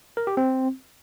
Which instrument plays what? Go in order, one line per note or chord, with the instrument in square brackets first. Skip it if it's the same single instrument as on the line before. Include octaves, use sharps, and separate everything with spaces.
[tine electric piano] A#4
G4
C4